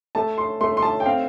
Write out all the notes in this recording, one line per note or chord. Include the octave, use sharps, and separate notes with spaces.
A3 A5
C6
A3 C6
C6
A5
G5
C4 F5